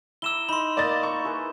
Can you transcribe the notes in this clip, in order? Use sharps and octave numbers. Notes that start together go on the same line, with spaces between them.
E4 A#5 D6 E6 E7 G7
D#4 B5 C6
A#3 D5 D#5 A6
A#5 C#6
E4 G#4 B4